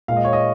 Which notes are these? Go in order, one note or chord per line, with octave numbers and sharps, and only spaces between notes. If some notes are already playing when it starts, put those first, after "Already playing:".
A#2 G#3 F5
D#5
C#5
D#5